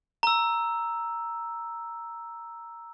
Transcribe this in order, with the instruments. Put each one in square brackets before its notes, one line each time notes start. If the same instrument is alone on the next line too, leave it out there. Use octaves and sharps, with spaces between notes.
[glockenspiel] A#5 E6